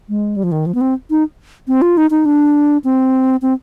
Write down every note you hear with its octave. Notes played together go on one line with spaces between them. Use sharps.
G#3
G3
F3
D#3
F3
B3
C4
D#4
C4
F4
D#4
D#4
D4
C4
C4